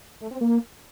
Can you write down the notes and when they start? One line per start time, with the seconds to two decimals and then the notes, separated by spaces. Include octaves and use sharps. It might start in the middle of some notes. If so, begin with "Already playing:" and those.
0.21 A3
0.31 C4
0.41 A#3